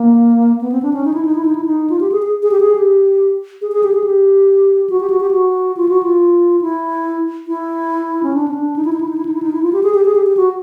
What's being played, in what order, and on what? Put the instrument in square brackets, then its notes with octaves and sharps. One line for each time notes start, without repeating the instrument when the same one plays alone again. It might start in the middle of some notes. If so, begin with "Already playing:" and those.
Already playing: [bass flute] A#3
B3
C4
D4
C#4
D#4
E4
D#4
E4
D#4
E4
D#4
F4
G4
G#4
G#4
G#4
G4
G#4
G4
G#4
G#4
G4
G#4
G4
F#4
G4
F#4
G4
F#4
F4
F#4
F4
E4
E4
C#4
D4
C#4
D4
D#4
E4
D#4
E4
D#4
E4
D#4
E4
D#4
E4
F4
G4
G#4
G4
G#4
G4
G4
F#4